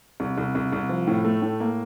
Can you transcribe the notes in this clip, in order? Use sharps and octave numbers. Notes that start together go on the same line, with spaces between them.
C2
C2
C2
C2
F3
A2
A3
A2
A#3